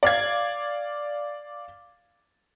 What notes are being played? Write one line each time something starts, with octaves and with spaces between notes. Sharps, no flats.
D5 F5 G#6